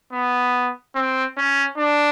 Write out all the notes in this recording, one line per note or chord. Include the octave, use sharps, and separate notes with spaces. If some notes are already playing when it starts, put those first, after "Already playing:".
B3
C4
C#4
D4